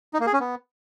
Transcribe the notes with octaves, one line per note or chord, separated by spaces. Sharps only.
D#4
A#3
G#4
C#4
B3